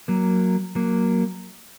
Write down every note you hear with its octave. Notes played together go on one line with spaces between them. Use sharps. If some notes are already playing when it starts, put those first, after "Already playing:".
F#3 A#3
F#3 A#3